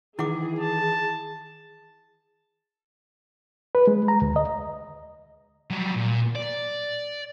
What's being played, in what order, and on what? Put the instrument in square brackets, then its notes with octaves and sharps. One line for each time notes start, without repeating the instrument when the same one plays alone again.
[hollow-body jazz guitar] D#3 E3 [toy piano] E4 F#5 D6 [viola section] G#4
[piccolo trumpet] A5
[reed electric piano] B4
G#3
A#5
D2
D#5
[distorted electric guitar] F#3 G3
A#2
D5